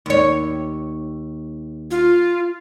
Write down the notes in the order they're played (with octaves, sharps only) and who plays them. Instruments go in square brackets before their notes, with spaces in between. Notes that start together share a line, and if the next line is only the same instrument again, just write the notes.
[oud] D#2 C#5
[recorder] F4